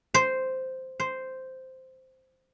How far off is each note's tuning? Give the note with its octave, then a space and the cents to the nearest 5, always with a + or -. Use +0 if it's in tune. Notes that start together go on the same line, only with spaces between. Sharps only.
C5 -5
C5 -5